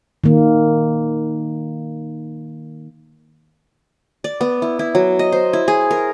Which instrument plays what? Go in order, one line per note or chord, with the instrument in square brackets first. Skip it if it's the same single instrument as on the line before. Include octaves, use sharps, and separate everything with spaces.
[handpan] D#3 A#3
[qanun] D5
B3
E4
E4
F#3
D#5
C5
E4
G#4
A#4